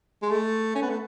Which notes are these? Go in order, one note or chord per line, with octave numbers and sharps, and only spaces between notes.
G#3
A3
C#4
B3
A3